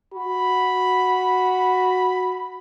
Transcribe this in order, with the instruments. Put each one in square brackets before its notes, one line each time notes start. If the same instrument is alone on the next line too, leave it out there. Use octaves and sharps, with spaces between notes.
[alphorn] F#4 [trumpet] B5